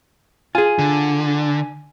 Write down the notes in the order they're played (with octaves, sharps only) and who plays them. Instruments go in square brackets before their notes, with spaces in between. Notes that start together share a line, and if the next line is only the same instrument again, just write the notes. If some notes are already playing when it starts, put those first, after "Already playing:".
[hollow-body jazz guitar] F4 G#4 [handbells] G#5
[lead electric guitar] D3